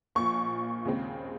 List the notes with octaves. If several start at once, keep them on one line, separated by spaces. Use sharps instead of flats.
A#1 A#2 F3 C#6
D#2 C#3 G#3 C4